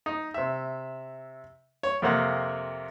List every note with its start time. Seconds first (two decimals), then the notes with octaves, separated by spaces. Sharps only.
0.06 D#4
0.34 C3 E5
1.83 C#5
2.02 F2 C3 A#3 F#5